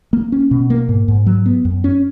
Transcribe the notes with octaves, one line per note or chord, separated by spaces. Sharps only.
A#3
C#4
B2
A#3
G#2
G#2
F#3
B3
F#2
C#4